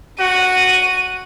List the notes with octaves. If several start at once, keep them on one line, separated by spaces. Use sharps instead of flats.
F#4 D#7